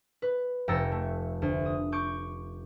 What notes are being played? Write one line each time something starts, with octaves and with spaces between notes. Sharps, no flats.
B4
F1 G5 A#5 E6 A6 C#7
A3
D2
D#6
C#6 D6 G6